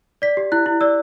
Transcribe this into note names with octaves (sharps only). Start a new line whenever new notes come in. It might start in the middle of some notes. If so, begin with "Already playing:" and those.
D5 B6
G4
E4 F#6
E4
D5 E6